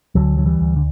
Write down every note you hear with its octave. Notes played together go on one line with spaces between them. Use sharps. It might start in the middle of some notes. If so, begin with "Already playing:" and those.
D2 D3 F#3
D3 F#3
E3 G3
D2
D3